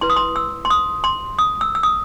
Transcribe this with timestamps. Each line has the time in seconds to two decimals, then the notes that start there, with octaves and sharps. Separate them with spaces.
0.01 E4 B4 C6
0.10 D#6
0.16 C6
0.36 E6
0.65 C6
0.70 D#6
1.04 C6
1.39 D#6
1.61 E6
1.75 E6
1.83 D#6